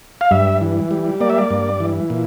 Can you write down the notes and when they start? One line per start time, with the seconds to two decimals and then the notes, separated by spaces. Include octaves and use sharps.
0.21 F5
0.31 G2 E5
0.61 E3
0.91 G3
1.21 A#3 D5
1.30 E5
1.38 D5
1.51 G2
1.80 E3
2.10 A#2